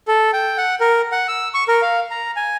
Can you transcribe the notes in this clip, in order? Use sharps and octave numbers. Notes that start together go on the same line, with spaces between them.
A4
G5
F#5
A#4
F#5
E6
C#6
A#4
F5
A#5
G#5